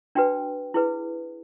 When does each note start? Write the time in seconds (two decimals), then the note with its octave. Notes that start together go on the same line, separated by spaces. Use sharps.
0.15 D4 F#4 B4 G5
0.74 E4 G#4 B4